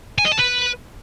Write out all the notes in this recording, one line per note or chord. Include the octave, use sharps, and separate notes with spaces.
G#5
D#5
A5
B4